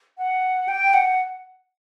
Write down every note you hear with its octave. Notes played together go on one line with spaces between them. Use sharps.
F#5
G5
F#5